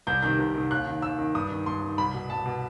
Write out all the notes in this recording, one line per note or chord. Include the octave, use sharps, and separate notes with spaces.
C2 G6
C3 D#3 G6
C2
C3 D#3
D#2 F#6
D#3
D#2 E6
D#3
G2 D#6
D#3
G2 C6
D#3
C2 B5
B2
C2 A5
B2